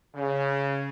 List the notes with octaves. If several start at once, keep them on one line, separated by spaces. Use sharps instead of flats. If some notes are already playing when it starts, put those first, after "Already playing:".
C#3